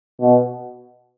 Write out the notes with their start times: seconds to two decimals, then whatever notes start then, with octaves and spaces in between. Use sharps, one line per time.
0.21 B2